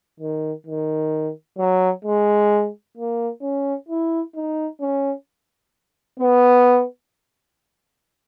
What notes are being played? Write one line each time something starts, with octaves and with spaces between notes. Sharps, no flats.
D#3
D#3
F#3
G#3
A#3
C#4
E4
D#4
C#4
B3